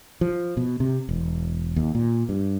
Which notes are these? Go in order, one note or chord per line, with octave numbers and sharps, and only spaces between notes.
F3
B2
C3
E1
D#2
A#2
G2